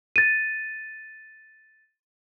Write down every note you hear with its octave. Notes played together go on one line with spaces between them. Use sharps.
A6 D#7